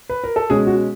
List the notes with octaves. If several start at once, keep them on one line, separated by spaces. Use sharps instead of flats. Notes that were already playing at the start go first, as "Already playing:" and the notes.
B4
A#4
A4
B2 G#3 C#4 G#4
F#4